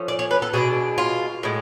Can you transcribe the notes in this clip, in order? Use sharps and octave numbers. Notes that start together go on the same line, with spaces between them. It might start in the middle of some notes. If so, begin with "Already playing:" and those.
Already playing: F3 A3 C#4
D5
C#5
B4
A4
B2 G#3 D4 G#4
F4
A2 G#3